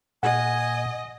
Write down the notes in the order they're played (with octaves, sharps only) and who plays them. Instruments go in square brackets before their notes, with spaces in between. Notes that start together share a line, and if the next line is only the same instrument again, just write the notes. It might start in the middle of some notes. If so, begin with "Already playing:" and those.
[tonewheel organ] A#2 [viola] D#5 [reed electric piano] F#5 [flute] G#5